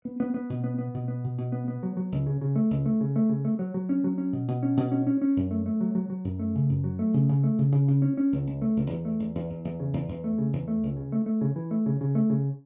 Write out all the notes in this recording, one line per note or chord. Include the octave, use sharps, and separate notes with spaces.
B3
B3
B3
B2
B3
B3
B2
B3
B2
B2
B3
B3
F#3
F#3
C#2
C#3
C#3
A3
C#2
A3
C#3
A3
C#3
A3
F#3
F#3
C#4
F#3
C#4
B2
B2
C#4
B2
C#4
C#4
C#4
F#2
A3
A3
F#3
F#3
F#3
F#2
A3
C#3
F#2
F#3
A3
C#3
C#3
A3
C#3
C#3
C#3
C#4
C#4
C#2
C#2
A3
C#2
E2
A3
E2
E2
E2
E2
C#3
E2
E2
A3
C#3
E2
A3
C#2
C#3
A3
A3
C#3
E3
A3
C#3
C#3
A3
C#3